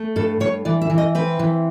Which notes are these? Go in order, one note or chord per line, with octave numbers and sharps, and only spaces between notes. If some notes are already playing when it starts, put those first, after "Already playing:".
Already playing: A3
G2 A4
G2 C#5
E3 D5
E5
E3
D#5
C4 B4
E3